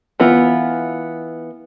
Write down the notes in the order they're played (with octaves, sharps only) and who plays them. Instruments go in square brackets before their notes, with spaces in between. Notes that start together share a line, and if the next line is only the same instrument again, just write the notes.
[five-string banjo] E3 B3 F4